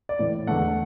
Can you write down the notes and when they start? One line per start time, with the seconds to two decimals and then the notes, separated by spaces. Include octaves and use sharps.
0.09 D5
0.19 A2 E3 A3
0.47 E2 D3 A3 F#5